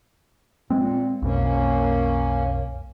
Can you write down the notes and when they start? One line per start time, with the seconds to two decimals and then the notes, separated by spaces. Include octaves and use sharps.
0.70 A#2 G#3 C4
1.22 B1 F2 B2 A#3 C#4